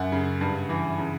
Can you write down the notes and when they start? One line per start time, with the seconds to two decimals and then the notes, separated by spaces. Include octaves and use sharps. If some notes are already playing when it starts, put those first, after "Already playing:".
Already playing: F#2 F#5
0.12 C#3
0.41 G2
0.69 E3
0.99 C#3